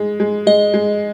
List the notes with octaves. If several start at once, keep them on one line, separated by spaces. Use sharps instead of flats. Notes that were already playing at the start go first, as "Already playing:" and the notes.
Already playing: G#3
G#3
G#3 D#5
G#3